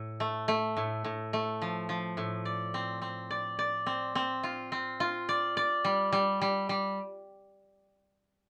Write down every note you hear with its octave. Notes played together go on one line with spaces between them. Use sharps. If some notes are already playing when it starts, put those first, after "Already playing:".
Already playing: A2
A3
A3
A2
A2
A3
F3
F3
A2
D5
C4
C4
D5
D5
C4
C4
F4
C4
F4
D5
D5
G3
G3
G3
G3